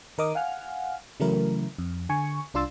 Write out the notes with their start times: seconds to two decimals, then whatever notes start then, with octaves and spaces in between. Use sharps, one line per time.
0.18 D#3 A#4 D#5 D6 D#6
0.35 F5 F#5 G#5 F6
1.20 C#3 E3 F#3 A3 E4 A#4
1.78 F2
2.09 D3 G#5 C#6
2.54 C2 D4 F4 C6 E6 A6